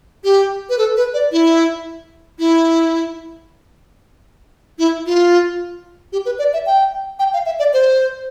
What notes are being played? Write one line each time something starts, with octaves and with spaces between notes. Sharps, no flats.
G4
B4
A4
B4
D5
E4
E4
E4
F4
G4
B4
D5
E5
G5
G5
F5
E5
D5
C5